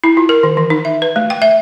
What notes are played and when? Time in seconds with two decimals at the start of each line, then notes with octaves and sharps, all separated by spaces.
0.04 E4
0.17 F4
0.29 A#4
0.43 D#3
0.57 E3
0.70 D#4
0.85 E5
1.02 B4
1.16 A3
1.30 G5
1.42 E5